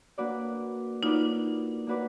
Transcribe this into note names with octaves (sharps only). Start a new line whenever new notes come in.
A#3 D4 F#4 B4 D5
A#3 D4 D#4 F4 F#4 B4 D5
A#3 D4 F#4 B4 D5